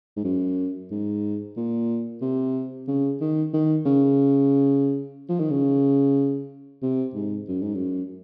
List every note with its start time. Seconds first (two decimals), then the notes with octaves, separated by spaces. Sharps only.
0.16 G#2
0.24 F#2
0.91 G#2
1.57 A#2
2.22 C3
2.88 C#3
3.21 D#3
3.53 D#3
3.86 C#3
5.29 F3
5.40 D#3
5.50 C#3
6.82 C3
7.15 G#2
7.48 F#2
7.62 G#2
7.75 F#2